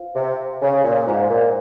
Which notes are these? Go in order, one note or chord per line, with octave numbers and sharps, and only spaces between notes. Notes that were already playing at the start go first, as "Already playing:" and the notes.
Already playing: F4 C5 F5
C3
C#3
A#2
G#2 F4 C5 F5 A#5
A#2